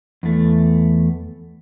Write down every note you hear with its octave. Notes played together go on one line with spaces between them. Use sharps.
E2 A3